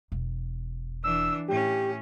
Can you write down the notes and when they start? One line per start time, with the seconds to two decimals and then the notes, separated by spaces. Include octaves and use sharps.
0.12 E1
1.04 E3 D4 E6
1.48 A2 C#4 G4